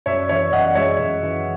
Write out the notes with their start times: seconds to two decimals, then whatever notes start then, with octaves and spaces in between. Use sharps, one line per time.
0.06 F#2 C#5 E5
0.29 E3 C#5 E5
0.52 F#2 D#5 F#5
0.67 F#5
0.75 G#3 C#5 E5
0.99 F#2
1.23 E3